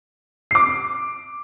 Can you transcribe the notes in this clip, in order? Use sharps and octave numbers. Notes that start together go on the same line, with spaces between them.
D6 C7